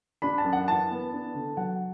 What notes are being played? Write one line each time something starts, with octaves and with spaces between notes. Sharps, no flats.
D4 B5
A5
F#2
F#5
E3 A5
B3
D4
D3
F#3 F#5